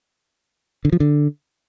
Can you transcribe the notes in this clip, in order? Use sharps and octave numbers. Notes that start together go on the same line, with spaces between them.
D3
F3
D3